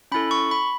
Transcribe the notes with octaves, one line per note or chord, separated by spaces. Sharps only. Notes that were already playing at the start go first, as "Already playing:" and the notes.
C#4 E4 A4 B5
C#6
B5